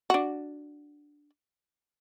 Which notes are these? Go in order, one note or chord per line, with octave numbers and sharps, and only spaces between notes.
D4 F#4